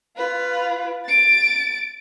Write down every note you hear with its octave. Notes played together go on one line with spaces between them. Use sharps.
F4 B4
A6 D7